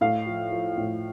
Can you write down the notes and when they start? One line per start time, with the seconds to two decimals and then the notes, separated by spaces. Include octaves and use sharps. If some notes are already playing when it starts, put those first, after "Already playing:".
0.01 A2 F5
0.26 F3
0.52 F3
0.78 A2